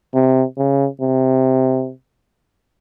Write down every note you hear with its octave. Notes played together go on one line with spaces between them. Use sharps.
C3
C#3
C3